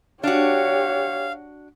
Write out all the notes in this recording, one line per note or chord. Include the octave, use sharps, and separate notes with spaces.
D4 F#4 G4 C#5 F5